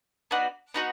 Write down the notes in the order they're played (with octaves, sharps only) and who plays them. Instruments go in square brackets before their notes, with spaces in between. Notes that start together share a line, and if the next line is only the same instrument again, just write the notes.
[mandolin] B3 D#4 F#4 D5
B3 D#4 F#4